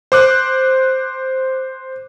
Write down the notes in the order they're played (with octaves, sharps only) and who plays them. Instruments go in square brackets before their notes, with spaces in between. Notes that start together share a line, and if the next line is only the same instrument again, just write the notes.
[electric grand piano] C5 D6 F#6